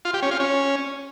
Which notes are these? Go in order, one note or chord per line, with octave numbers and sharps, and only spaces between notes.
F4
G4
C#4
F4
C#4